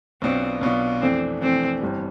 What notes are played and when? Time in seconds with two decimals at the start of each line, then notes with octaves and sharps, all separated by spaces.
0.22 B1 B2 B3 C4 D4 F4
0.61 B1 B2 B3 D4 F4
1.02 F2 E3 A3 C4 D4
1.42 F2 E3 A3 C4 D4
1.81 G1 G2 E3 G3